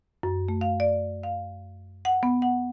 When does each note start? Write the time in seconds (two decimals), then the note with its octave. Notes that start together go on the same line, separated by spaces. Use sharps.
0.23 F#2
0.48 A3
0.61 F5
0.80 D5
1.23 F5
2.05 F#5
2.23 B3
2.42 F#5